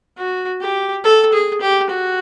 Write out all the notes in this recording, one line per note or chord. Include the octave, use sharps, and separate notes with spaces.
F#4
G4
A4
G#4
G4
F#4